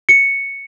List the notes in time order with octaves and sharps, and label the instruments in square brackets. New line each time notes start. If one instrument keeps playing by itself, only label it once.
[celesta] C#7